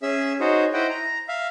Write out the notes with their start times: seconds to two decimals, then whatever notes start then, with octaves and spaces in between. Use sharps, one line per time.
0.02 C#4 G#4 E5 E6
0.40 D#4 F#4 G#4 C5 C#5
0.74 E4 C5 D#5 F#5 G5
0.90 A#5
1.28 E5 F5